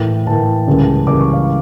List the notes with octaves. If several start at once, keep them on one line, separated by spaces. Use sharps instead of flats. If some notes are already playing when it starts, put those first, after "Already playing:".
Already playing: A2 E3 A#3 G5
A2 E3 A#3 A5
C#2 C#3 E3 G3 A#3
C#2 C#3 E3 G3 A#3 D6
C#6
F5